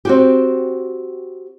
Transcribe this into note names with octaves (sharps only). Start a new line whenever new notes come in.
C4 F#4 G4